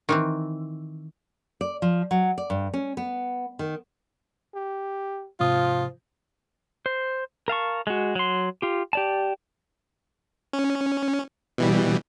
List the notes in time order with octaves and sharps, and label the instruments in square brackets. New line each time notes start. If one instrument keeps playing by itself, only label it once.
[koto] D#3 E3 C4
[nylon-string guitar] D5
F3
F#3
D5
G2
C#4
B3
D#3
[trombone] G4
[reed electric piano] G#2 C3 D#6 [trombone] F3 [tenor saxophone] F4
[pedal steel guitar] C5
A#4 F5 A5 C#6
G#3 F#4
F#3 C6
F4 G4
G4 D5 A5
[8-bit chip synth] C#4
B2 E3 G3